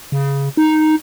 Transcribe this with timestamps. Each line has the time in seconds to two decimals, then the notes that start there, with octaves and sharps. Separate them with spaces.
0.12 C#3
0.57 D#4